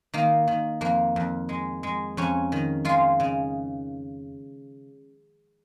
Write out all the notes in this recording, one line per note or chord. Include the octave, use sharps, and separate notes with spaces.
D#3 A#3
D#3
F2 A#3
F2
G#3
G#3
F2 C#4
D#3
G#3 F4
C#3